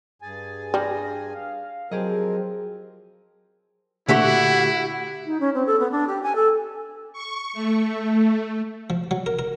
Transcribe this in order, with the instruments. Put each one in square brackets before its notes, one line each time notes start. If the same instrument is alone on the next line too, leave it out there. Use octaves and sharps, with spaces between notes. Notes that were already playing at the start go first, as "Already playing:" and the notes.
[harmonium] G2 G#4 G#5 [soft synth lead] A6
[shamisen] G3 [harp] D4 F6 [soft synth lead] A#6
[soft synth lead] F5
[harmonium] F3 C4 A#4 [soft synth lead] F#3 [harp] G4 G#4 D#5
[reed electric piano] A#2 D3 A3 [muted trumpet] E4 [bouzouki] F#4 G4 E5 [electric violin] F#5
[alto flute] D#4
C#4
C4
A4
B3
D4
G4
G#5
A4
[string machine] C#6
A3
[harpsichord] F3
F#3
A#4
A#4